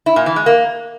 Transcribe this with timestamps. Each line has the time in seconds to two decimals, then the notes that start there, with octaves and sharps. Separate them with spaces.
0.06 E4
0.16 A#2
0.26 E3
0.36 G#3
0.46 A#3